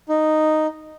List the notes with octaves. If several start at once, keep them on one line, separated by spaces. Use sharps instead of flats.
D#4